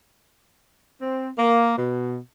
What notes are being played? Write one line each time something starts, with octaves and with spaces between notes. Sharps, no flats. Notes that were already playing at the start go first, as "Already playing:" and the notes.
C4
A#3
B2